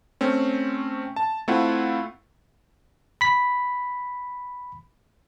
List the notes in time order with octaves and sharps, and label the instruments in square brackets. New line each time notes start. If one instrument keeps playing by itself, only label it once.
[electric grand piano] A3 C4 C#4
A5
A3 C4 E4 F4 F#5
[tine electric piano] B5 B6